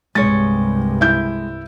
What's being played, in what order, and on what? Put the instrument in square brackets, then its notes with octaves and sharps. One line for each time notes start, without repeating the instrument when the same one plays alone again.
[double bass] C2 G2 [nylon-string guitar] G#3 C#5 [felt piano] A6
[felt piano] E4 G6